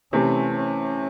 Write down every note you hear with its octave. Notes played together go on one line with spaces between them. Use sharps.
C3 E3 A3 C4 C#4
C#4